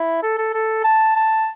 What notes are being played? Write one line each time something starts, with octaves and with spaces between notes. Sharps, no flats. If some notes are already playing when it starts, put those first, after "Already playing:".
Already playing: E4
A4
A4
A4
A5
A5